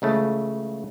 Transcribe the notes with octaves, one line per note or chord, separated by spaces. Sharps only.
C#2 C#3 E3 A3